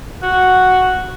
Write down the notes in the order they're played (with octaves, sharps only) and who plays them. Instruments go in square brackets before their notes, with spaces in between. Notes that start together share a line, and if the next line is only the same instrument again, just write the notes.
[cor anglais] F#4